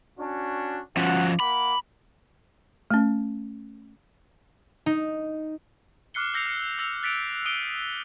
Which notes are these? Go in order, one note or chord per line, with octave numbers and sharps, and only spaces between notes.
C#4 D4 F#4
F3 C#4 F#4 F#5
A#3 F#5 B5 D6
A3 C#4
D#4
D6 F6 F#6 C7 C#7 G7
E6 G6 A#6 C7 C#7 F7
F6 C#7
E6 A#6 F7
F#6 A6 B6 C#7 D7 F7
D#6 D7 D#7 G7